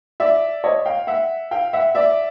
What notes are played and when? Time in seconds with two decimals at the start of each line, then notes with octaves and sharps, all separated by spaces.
0.20 D5 E5
0.64 C#5 D#5
0.85 F5 G5
1.07 E5 F#5
1.51 F5 G5
1.73 E5 F#5
1.95 D5 E5